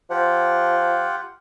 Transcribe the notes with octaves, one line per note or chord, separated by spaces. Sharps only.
F3 F4 G4 F#5